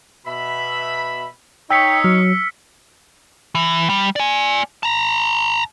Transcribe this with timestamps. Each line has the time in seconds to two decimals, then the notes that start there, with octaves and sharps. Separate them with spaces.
0.27 B2 E5 B5
1.70 D#4 C#5 G5 E6 B6 C#7
2.04 F#3 F6
3.55 E3
3.89 G3
4.16 D5 G#5
4.83 A5 A#5